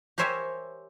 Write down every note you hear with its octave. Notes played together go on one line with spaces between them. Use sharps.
G4 A#4 C5 C#5 E5 G#5